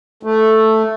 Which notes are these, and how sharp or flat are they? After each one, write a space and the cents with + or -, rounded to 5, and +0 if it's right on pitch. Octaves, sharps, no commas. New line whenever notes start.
A3 +0